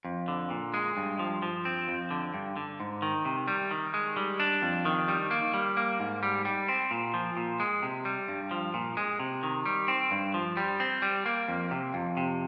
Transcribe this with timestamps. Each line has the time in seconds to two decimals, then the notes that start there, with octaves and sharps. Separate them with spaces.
0.05 F2
0.28 D3
0.50 A#2
0.74 G#3
0.97 G2
1.19 F3
1.42 F3
1.65 C4
1.88 F2
2.11 D3
2.34 G2
2.56 D3
2.80 G#2
3.02 D#3
3.25 C3
3.48 G3
3.71 D#3
3.94 G#3
4.17 G3
4.40 D4
4.62 F2
4.85 D#3
5.08 G3
5.31 A#3
5.54 G3
5.77 A#3
6.00 G#2
6.23 G3
6.45 G3
6.69 C4
6.91 A#2
7.14 F3
7.37 A#2
7.60 G#3
7.82 C3
8.05 G3
8.28 G2
8.51 F3
8.74 A#2
8.97 G#3
9.20 C3
9.43 D#3
9.66 G3
9.88 C4
10.11 G2
10.34 F3
10.57 G3
10.80 C4
11.02 G3
11.26 A#3
11.48 F2
11.71 C3
11.94 F2
12.17 C3